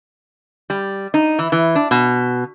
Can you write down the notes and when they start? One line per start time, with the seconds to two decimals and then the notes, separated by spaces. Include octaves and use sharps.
0.70 G3
1.14 D#4
1.39 E3
1.52 E3
1.75 D4
1.91 B2